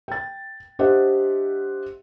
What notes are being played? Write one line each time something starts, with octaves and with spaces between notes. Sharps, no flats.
G5 A6
D4 G4 C5 D#5 E5 F#5